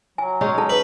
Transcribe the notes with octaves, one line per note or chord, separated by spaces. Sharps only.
F#3 G#5
G#3 C#4 D#4
A4 A5
B4